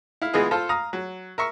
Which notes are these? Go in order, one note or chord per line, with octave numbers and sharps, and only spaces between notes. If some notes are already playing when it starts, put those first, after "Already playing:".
E4 F5
E3 G#3 B3 F4 G#4 D#5
F4 A4 C5 F5
F5 A#5 D#6
F#3
A#4 E5 C#6